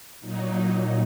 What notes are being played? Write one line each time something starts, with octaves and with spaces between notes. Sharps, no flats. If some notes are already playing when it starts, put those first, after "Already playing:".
A#2 F#3 D#4
D#4